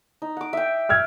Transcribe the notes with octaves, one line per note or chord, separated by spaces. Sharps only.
D#4
F#5 D6
E5 G5
E6 F6 G#6